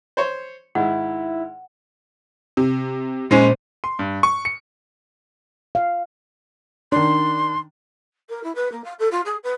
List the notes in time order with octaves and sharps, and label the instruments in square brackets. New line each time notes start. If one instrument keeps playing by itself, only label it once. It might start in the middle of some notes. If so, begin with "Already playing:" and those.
[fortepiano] C5 C#5
[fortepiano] G#2 D#3 [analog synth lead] E4 [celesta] F#5
[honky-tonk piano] C3
[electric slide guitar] A#2 C5 [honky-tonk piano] G#3 C#4
[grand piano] C6
G2
C#6
C#7
[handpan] F5
[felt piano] D#3 D4 [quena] C6
[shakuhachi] A#4
E4
B4
A#3
F5
A4
F4
G#4
B4